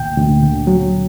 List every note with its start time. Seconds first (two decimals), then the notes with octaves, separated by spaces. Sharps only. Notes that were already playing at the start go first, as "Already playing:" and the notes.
Already playing: D2 A#2 G5
0.17 D2
0.43 D3
0.67 F#3